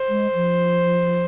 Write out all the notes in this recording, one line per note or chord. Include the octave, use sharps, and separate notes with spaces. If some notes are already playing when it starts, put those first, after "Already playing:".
Already playing: C5
G#3
F3